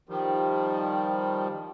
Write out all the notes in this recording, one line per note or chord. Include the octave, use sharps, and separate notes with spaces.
D#3 F3 G3